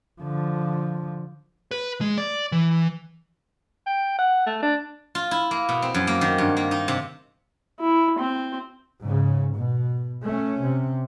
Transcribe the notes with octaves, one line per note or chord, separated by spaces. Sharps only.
D3 F3
B4
G#3
D5
E3
G5
F#5
A3
D4
F4
E4
A#3
B2
C4
F#2
A#3
D#3
G2
A#3
D#4
C3
E4
C4 C5
G#2 C#3
B2
A3 C#4
C3